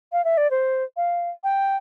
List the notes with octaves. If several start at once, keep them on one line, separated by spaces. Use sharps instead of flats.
F5
E5
D5
C5
F5
G5